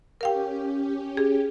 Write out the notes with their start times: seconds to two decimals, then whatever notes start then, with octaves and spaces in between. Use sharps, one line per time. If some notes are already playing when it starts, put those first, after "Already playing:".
0.21 C#4 G4 A#4 F5 G5
1.17 G#4